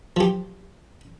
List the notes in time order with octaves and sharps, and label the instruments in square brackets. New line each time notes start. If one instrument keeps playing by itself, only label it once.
[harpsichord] F3 G4